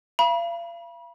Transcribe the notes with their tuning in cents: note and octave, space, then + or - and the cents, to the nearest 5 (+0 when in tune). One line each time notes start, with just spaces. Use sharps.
F5 -40 B5 -35